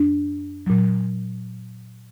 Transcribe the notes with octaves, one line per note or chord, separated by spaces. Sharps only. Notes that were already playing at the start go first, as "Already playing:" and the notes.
Already playing: F#2 D4
A#2 F#3